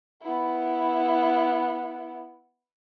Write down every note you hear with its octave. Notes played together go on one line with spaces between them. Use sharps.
B3 E4